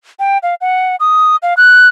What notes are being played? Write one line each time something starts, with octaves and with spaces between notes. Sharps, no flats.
G5
F5
F#5
D#6
F5
F#6